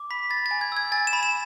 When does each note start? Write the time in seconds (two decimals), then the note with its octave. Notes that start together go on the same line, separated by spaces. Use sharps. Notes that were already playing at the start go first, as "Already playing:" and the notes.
Already playing: D6
0.10 B5 B6
0.30 B5 A6
0.46 A6
0.51 G#5
0.61 G#6
0.72 E6 G#6
0.92 G#5 A6
1.07 E7
1.13 B5
1.23 E7